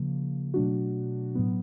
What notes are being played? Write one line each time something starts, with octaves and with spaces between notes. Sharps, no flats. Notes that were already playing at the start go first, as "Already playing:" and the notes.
Already playing: C#3 F3 A#3
B2 F#3 A3 D4 F#4
A2 F#3 B3